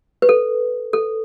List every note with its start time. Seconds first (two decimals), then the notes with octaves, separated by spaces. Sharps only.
0.22 B4
0.29 A4
0.93 A4